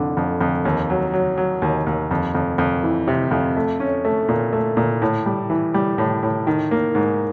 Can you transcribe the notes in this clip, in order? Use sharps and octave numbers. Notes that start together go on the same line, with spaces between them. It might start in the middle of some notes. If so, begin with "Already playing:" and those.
Already playing: F2 D3
F2
F2
D#2
F#3
F#3
F#3
D#2
D#2
F2
F2
F2
E3
C3
F2
A3
C#4
A3
A#2
A3
A#2
A2
G3
E3
G3
A2
A2
D#3
A#3
G#2